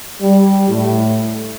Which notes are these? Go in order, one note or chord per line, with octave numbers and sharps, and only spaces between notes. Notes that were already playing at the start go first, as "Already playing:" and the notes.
G3
A2